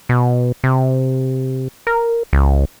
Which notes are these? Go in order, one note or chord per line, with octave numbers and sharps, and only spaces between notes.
B2
C3
A#4
C#2